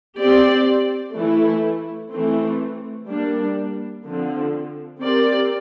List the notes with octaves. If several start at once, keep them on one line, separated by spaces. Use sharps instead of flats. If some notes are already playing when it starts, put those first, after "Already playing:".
C4 G4 D5
E3 A3 E4
E3 A3 C4
G3 A#3 D4
D3 F3 C4
C4 G4 A#4 D5